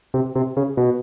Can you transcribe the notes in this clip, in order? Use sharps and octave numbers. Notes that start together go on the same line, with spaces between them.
C3
C3
C#3
B2